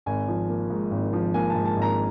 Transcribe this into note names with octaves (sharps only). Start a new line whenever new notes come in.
G#1 G#5
F3
A#3
G#2
G#1
F3
A#3 G#5
A5
G#2
A5
G#1
A#5